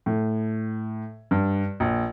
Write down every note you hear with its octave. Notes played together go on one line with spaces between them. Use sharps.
A2
G2
A#1